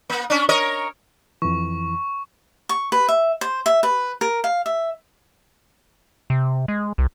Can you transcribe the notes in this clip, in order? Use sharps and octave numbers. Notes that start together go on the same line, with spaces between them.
A#3
C#4 D4
A#4 C#5 D#5
F2 E3 C#6
C#6
B4
E5
C5
E5
B4
A#4
F5
E5
C3
G#3
C2